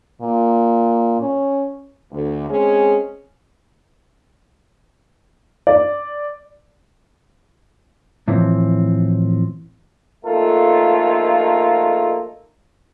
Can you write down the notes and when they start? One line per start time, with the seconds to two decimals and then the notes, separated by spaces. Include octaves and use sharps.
0.21 A#2
1.20 C#4
2.12 D2
2.49 G#3 C4 C#4 G#4
5.67 D5
8.28 A2 E3 F3 C4
10.25 A#1 A3 A#3 D#4 F4 A4